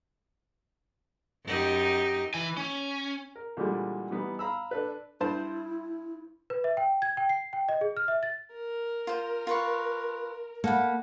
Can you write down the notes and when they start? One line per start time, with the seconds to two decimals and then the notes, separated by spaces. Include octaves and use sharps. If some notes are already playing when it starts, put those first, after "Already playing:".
1.45 F#2 D#4 G4
2.34 E3 G#5
2.57 C#4
3.35 A#4
3.57 A#2 D3 E3 G3 G#3
4.11 E3 G3 B3 D#4
4.39 F5 A#5 B5 E6
4.71 D4 A4 B4
5.20 G2 E4 C5 A5
6.50 B4
6.64 E5
6.77 G5
7.02 G#6
7.17 G5
7.29 C7
7.53 G5
7.69 D#5
7.81 G#4
7.97 F6
8.08 E5
8.23 A6
8.54 A#4
9.07 F4 C5
9.47 F4 B4 C#6
10.64 A#3 A4 F#5 B5